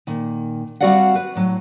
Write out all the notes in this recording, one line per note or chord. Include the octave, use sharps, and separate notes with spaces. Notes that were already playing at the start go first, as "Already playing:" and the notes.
A#2 D#3
G3 C4 F#4 D5 F5 F#5
B4
A2 F#3